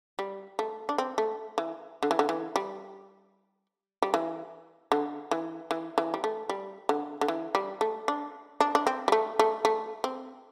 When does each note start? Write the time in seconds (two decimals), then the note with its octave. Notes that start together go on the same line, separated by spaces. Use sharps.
0.19 G3
0.59 A3
0.89 D4
0.98 C4
1.18 A3
1.58 E3
2.03 D3
2.11 E3
2.19 D3
2.29 E3
2.56 G3
4.02 G3
4.14 E3
4.92 D3
5.31 E3
5.71 E3
5.98 E3
6.14 G3
6.24 A3
6.49 G3
6.89 D3
7.21 D3
7.28 E3
7.55 G3
7.81 A3
8.08 D4
8.61 D4
8.75 D4
8.87 C4
9.08 G3
9.12 A3
9.39 A3
9.65 A3
10.04 C4